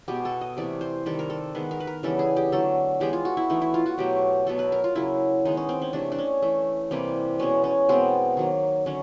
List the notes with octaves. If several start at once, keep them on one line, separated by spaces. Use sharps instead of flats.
B2 G#3 B3 G4
A4
D#5
C3 E3 A3 D5
C5
C3 D#3 G3 A4
A#4
A4
D#3 G#3 B3 B4
A#4
B4
A#4
C#3 E3 G3 B3 A4
G#4
G4
D3 F#3 A3 A4
E3 G#3 B3 G4
F4
F#4
E4
E3 A3 D#4
E4
F4
F#4
B2 F#3 A3 G4
B2 F#3 B3 A4
B4
A#4
F4
C#3 F#3 A#3 E4
D#3 G#3 B3 D#4
C#4
C4
C#4
C3 E3 A3 D4
D4
C#4
E3 A3
C3 E3 G3 A#3 C4
B2 G#3 B3 C#4
C#4
B2 G#3 B3 C4
D#3 F#3 A#3
D3 F#3 C#4